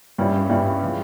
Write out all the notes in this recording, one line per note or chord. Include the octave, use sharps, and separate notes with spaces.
G2 G3 C#4 E4
G2 G3 C#4 E4
F3 G#3